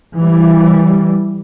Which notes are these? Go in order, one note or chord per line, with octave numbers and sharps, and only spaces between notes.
E3 G3